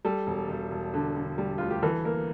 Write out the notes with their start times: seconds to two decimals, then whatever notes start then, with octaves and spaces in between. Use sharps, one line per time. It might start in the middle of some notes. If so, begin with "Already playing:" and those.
0.05 G3 A4
0.27 E1
0.49 E1
0.71 E1
0.94 D3
1.16 D3
1.38 G3
1.58 D2 F4
1.70 G4
1.82 E3 A4
2.05 A#3 A#4